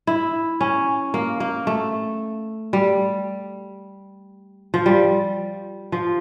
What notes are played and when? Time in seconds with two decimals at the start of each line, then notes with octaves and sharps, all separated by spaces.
0.07 E4
0.61 C#4
1.14 A#3
1.40 A#3
1.67 A3
2.73 G3
4.74 F3
4.86 G3
5.92 F3